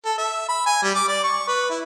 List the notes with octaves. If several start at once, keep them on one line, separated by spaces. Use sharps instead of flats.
A4
E5
B5
G#5
G3
D6
D5
C#6
B4
E4